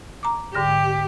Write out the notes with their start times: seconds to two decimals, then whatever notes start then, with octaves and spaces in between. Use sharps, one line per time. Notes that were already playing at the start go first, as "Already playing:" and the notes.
0.23 A#5 D6
0.55 G#2 D3 G4 A#6